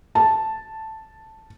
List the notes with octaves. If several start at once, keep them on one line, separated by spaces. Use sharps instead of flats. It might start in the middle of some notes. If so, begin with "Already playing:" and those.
A5